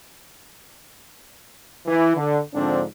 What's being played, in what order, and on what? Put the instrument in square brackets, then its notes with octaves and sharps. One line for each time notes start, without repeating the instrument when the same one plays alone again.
[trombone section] E3
D3
G#2 D3 F3 C4 D4